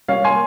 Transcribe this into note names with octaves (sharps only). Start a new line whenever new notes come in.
G3 C#5 F5
A#3 G#5 C6